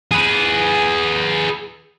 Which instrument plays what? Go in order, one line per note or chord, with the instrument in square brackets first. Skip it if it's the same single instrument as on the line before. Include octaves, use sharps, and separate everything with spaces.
[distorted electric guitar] G#4 B4